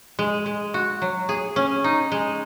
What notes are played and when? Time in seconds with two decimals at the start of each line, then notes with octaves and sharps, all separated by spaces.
0.19 G#3
0.46 G#3
0.74 F#4
1.02 F#3
1.29 G#4
1.56 C#4
1.84 D#4
2.12 G#3